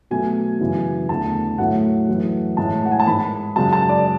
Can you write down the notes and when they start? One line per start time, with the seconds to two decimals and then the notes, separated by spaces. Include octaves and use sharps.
0.11 B2 F#3 A3 G#5
0.60 F#2 C#3 E3
1.09 E2 D3 A3 A5
1.58 A2 F#3 A3 F#5
2.08 F#2 E3 A3
2.57 A2 G#3 A5
2.85 F#5
2.92 G#5
3.00 A5
3.07 G#2 G#3 B5
3.56 F#2 C#3 G#3 A5
3.73 A5
3.89 D5